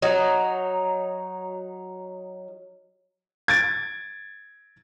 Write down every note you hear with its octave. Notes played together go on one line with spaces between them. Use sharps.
F#3 D#4
G#6 A6 D7